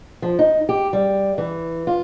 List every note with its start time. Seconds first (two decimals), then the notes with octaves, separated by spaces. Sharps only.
0.22 F3
0.39 D#4
0.69 G4
0.93 G3
1.38 E3
1.87 F4